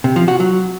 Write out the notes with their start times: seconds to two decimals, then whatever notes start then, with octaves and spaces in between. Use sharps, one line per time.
0.04 C3
0.16 F3
0.28 F#4
0.40 F#3